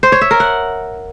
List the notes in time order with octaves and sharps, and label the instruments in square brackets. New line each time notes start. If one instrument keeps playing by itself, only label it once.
[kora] C5
C#5
E5
A#4
F#5